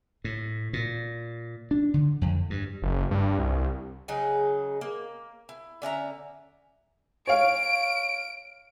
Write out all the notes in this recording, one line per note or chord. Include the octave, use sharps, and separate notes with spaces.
A2
A#2
D4
D3
F2
G2
F#1
G2
C2
C#3 F#3 D#4 G#4
A#3
E4
D3 C#4 E5 A#5
C#5 F5 D7